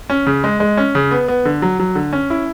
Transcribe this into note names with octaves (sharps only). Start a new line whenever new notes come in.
C#4
C#3
G#3
G#3
C#4
C#3
B3
B3
D3
F#3
F#3
D3
C#4
E4